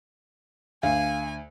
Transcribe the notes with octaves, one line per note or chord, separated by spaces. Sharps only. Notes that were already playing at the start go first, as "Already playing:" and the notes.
D2 F5 G#5